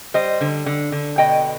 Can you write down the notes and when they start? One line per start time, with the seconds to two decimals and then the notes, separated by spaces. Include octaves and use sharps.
0.14 G3 C5 D#5
0.41 D3
0.66 D3
0.92 D3
1.18 B2 D#5 G5